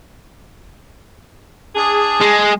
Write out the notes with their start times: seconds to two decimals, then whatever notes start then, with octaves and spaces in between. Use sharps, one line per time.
1.75 D4 G#4
2.21 G#3